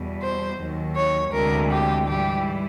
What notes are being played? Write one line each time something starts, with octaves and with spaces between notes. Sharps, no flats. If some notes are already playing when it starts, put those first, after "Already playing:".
Already playing: E2 B2 G3
C5
D#2 D#3 F#3
C#5
D2 C3 E3 G#3 A#4
G4
G#2 E3 G3 G4